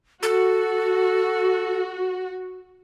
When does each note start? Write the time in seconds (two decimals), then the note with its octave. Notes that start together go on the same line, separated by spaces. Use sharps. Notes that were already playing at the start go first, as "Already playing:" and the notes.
0.23 F#4 A4